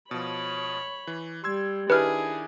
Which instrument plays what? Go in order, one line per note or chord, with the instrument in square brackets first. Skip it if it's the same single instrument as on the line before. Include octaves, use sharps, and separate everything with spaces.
[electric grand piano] B2 F3 [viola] C#5 B5
[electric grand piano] E3
[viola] G3 [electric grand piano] C6 E6 G#6
[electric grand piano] D#3 D4 E4 [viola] G#4 [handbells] B4 F6